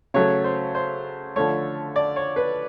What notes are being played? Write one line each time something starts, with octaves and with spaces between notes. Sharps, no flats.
C#3 F#3 A3 C#5
C5
C5
D3 F3 A3 C#5
D5
C#5
B4